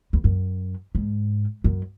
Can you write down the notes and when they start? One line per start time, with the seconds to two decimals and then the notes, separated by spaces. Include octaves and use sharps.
0.13 E2
0.24 F#2
0.95 G#2
1.64 F#2